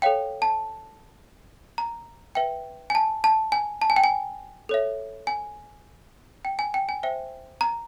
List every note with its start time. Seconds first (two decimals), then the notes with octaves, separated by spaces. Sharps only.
0.02 A4 C#5 F5 G5
0.42 A5
1.78 A#5
2.35 B4 E5 G5
2.90 G#5
2.95 A5
3.24 A5
3.52 G#5
3.82 A5
3.90 G#5
3.96 G5
4.04 G#5
4.69 A4 C#5 E5
5.27 G#5
6.45 G5
6.59 G#5
6.74 G5
6.89 G#5
7.03 C5 E5 G5
7.61 A#5